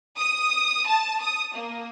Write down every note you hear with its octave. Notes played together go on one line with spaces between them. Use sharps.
D#6
A5
D#6
A#3